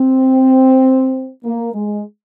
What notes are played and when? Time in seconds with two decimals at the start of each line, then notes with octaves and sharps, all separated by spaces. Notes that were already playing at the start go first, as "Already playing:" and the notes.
Already playing: C4
1.44 A#3
1.74 G#3